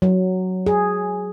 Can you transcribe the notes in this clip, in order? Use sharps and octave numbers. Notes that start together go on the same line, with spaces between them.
F#3
G#4